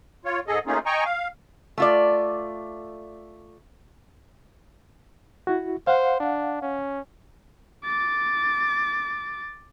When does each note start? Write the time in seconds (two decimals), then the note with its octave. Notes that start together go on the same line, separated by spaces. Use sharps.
0.25 F4 C#5
0.47 G#2 G#4 A4 D#5
0.67 A3 A#3 C#4 D#4 F4 G#4
0.86 D#5 G5 G#5 A#5 C#6
1.05 F5
1.78 A3 F4 D5
5.47 E4 F#4
5.87 C5 F5 F#5
6.20 D4
6.62 C#4
7.85 D6 A6